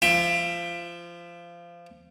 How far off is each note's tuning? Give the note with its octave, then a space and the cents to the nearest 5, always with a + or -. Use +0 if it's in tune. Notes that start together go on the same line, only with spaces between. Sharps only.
F3 -20 E5 +10 G5 +25